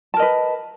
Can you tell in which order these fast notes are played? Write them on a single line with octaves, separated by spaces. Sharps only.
A5 A#4 D#5 B4